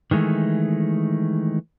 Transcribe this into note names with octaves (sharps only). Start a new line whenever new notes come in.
D#3 E3 G#3 A3